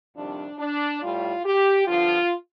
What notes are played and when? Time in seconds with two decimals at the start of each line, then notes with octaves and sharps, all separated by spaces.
0.15 F2 C3 D#3 G3 D4
0.59 D4
1.02 A2 G3 F4
1.45 G4
1.87 G2 D3 F3 F4